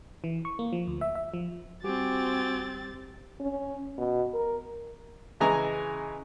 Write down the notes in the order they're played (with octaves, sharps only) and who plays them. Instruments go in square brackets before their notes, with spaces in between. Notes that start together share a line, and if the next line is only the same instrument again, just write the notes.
[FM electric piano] E3
C#6
A#3
F3
D2
E5
E5
F3
[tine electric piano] G3 G4 [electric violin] C4 A6 [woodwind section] F#4 G#5 D6
[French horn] C#4
B2
A#4
[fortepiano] C#3 E3 G#3 G#5 A#5